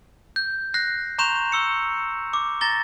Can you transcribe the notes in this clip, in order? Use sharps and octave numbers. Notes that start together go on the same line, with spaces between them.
G6
F#6 A#6 C7
A#5 C6 C#6 G6 E7 F7
C#6 E6 C#7
D6
A#5 A6 A#6 G7